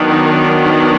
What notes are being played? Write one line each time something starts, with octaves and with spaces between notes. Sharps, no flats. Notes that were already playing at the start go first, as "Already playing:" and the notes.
Already playing: D#3 F#3 B3 D4
D#4